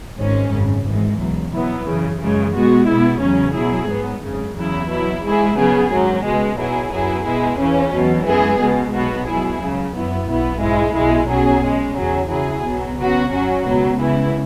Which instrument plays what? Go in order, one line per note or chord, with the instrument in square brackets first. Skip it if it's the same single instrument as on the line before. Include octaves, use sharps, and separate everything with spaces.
[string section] G#1 G#2 G#3 C#4
G#1 F#2 C#3
G#1 G#2 E3 G#3
C#2 B2 F#3
B2 F#3 B3 E4
F#2 C#3 E3
F#2 C#3 E3 G#3
B2 G#3 B3 F#4
B2 B3 E4
E2 C#3 F#3 C#4
B2 F#3 E4 G#4
G#2 F#3 B3
G#1 F#2 C#3
E2 C#3 F#3 E4
B2 F#3 E4
G#2 G#3 E4 G#4
C#3 F#3 B3 G#4
G#1 F#2 F#3
C#2 B2 G#3
B1 B2 F#3 E4 G#4
F#2 F#3 B3 E4 G#4
B2 G#3 B3 E4 G#4
E2 C#3 E3 C#4
E2 B2 F#3
F#2 E3 G#3 B3 G#4
C#2 B2 G#3
B1 B2 B3 F#4
B2 F#3 E4 G#4
C#2 C#3 F#3
F#2 F#3 B3 E4
B1 B2 B3 E4
G#2 G#3 E4
B1 B2 G#3 E4 G#4
B1 B2 F#3 C#4 G#4
B2 G#3 C#4
E2 C#3 F#3 C#4 G#4
C#3 F#3 E4 G#4
B1 B2 F#3 B3
C#3 F#3 B3 F#4
F#2 F#3 C#4 F#4
C#2 B2 F#3 B3
C#2 C#3 E3 B3 E4